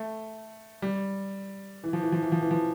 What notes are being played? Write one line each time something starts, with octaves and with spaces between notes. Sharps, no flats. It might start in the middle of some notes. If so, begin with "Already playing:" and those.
Already playing: A3
G3
E3
F3
E3
F3
E3
F3
E3
F3